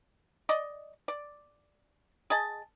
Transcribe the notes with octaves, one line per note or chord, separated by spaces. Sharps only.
D5 D#5
D5
G#4 D#5 A5